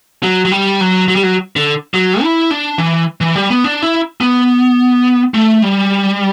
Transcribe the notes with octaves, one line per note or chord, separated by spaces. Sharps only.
F#3
F#3
G3
F#3
F#3
G3
F#3
D3
F#3
E4
D4
E3
E3
G3
B3
D4
E4
B3
A3
G3